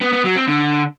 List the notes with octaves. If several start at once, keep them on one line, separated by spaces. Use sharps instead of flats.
B3
B3
F#3
C4
D3